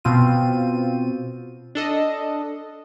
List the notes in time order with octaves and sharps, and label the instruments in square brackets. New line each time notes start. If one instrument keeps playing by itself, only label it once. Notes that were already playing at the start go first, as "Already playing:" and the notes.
[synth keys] B2 C4 F4 D#7
D4 A4 D#5